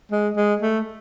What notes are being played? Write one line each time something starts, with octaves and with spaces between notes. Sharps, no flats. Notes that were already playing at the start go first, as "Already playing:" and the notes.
G#3
G#3
A3